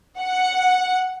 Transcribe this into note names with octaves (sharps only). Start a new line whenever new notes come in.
F#5